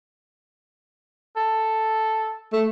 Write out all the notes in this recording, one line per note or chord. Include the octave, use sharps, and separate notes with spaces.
A4
A3